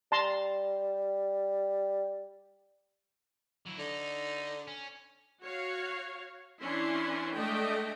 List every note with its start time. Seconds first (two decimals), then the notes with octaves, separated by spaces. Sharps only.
0.12 G3 A5 A#5 C6
3.67 F#3 E4
3.79 D3 D#4
4.67 C#4
5.43 F#4 C#5 F5
6.63 E3 C#4 D4 E4 C6
7.37 G#3 A3 D4 D#5 G5